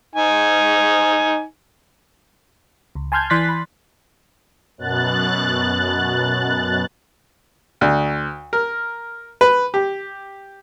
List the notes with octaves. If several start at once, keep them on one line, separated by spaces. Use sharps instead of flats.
D#4 G#5
C#2
G#5 A5 C6 F6 G6 G#6
E3 D5 C6 F#6 A6 B6
B5
F#2 B2 F#6 A6
D2
A#4
B4
G4